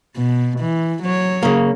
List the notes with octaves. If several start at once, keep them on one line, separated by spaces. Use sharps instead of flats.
B2
E3
F#3 C#5
C#3 A#3